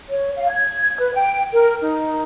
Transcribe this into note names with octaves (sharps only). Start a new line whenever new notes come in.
C#5
F5
G#6
B4
G5
A#4
D#4